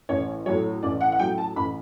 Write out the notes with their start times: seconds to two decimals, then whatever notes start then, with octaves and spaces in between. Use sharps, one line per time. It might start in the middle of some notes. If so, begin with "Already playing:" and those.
0.09 A1 C#5
0.46 A2 F#3 C#5
0.83 A1 D5
1.01 F#5
1.12 F#5
1.19 A2 F#3 G5
1.38 A5
1.56 A1 B5